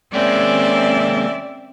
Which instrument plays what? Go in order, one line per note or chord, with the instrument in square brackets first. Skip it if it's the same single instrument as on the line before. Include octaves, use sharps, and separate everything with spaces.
[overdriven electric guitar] G#3 A#3 [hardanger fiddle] C4 C#4 [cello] D5 E5